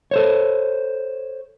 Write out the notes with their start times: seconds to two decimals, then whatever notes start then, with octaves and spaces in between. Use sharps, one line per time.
0.11 A4 C5 C#5